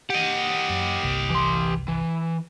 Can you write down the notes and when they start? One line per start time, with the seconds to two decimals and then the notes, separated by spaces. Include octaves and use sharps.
0.10 G4 D#5 F#5
0.69 F#2
1.03 G1 C2 C3
1.30 E3 C6
1.88 E3